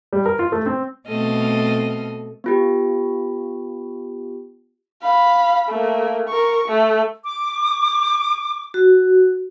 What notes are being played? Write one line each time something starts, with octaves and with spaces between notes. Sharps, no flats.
G3
A#4
F4
A3
C4
B2 A3 C4 A4 D#5 F6
B3 F4 G4
F5 B5
A3 A#3
A#4 C#6
A3
D6
F#4